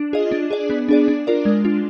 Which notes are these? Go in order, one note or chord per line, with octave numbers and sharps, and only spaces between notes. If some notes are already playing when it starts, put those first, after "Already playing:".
Already playing: D4
F4 G#4 D#5
D4
G#4 D5
B3
D4 G#4 D5
D4
F4 A#4 D5
G#3
D4 F4